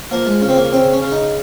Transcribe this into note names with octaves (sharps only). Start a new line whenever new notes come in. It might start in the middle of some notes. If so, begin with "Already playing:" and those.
F3 A#3
G#3
C#3
C4
A#3
C#3 C4
C#4
C#3
D#4